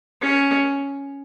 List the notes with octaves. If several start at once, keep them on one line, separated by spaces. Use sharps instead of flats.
C#4